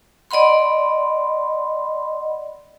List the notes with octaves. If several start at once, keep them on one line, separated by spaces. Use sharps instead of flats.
D5 D#5 F#5 B5 C6